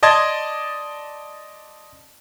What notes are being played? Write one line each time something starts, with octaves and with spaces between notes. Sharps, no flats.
D5 D#5 A5 C6 G#6